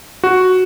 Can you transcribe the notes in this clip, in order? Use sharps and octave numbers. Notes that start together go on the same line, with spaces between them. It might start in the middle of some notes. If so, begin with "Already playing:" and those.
F#4